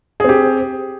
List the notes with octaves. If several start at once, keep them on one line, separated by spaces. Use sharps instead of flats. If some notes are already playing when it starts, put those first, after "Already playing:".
C4 G4 G#4